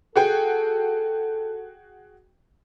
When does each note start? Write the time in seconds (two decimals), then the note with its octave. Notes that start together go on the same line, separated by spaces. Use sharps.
0.16 F#4 G#4 A4 G5